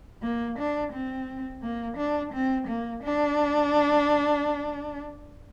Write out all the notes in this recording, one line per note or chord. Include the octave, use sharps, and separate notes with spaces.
A#3
D4
C4
A#3
D4
C4
A#3
D4